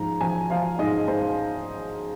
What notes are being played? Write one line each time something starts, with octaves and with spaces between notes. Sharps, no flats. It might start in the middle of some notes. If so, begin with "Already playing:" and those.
Already playing: G#2 F3 A#5
F3 G#5
F3 F5
G#2 D#5
G#2 C5